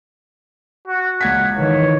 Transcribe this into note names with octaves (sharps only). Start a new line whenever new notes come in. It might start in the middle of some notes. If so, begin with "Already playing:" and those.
F#4
C#2 F#5 G#6 B6
D#3 E3 C#5